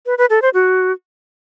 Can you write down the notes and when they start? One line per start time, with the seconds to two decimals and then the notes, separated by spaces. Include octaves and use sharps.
0.06 B4
0.18 B4
0.30 A4
0.42 C5
0.54 F#4